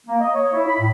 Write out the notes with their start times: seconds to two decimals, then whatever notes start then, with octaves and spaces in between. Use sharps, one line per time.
0.07 A#3
0.21 D#5
0.33 C#5
0.53 E4
0.67 B5
0.79 A2